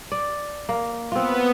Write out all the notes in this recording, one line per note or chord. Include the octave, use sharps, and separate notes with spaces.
D5
A#3
B3 C4 F4